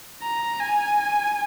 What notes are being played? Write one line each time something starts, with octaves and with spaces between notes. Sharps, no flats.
A#5
G#5